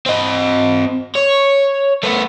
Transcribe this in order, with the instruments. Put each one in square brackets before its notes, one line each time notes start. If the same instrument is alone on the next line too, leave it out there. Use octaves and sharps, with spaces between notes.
[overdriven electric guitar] C4 D#5
C#5
A3 B3